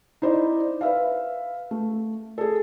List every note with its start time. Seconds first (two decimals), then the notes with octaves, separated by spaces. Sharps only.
0.22 D#4 E4 C5 D5
0.81 B4 E5 F5
1.71 A3
2.38 G#4 A4